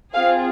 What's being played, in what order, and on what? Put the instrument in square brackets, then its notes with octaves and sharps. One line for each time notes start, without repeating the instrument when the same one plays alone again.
[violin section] C4 F4 G#4 F5